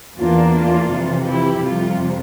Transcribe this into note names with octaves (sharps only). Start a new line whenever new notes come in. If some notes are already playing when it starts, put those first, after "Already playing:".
E2 E3 A#3 D4 F4
F4
F2 C3 E3
E4 G4
F2 C3 G3 F4